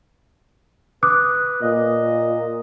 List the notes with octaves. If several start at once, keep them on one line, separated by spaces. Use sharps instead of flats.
B4 D6 D#6 F#6
A#2 D#5